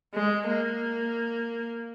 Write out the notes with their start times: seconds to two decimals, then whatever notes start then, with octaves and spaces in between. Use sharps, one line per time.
0.15 G#3
0.49 A#3